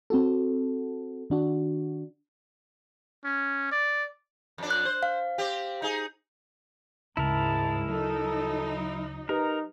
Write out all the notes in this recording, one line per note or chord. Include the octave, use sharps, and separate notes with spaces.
C4 F#4 A4
D#3 D4 F#4
C#4
D5
F2 D4
F#6
C5
F5
C4 G4
D#4 G#4
D2 G#2 C#3 G#3 E4 A#4 A5
F#3 D#4 A4
D#4 G4 A#4 B4 A#5